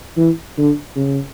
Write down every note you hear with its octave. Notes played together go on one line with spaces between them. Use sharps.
E3
D3
C#3